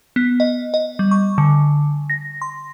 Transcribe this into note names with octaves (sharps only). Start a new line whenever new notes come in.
B3
D#5
D#5
G3
C#6
D3
A#6
C6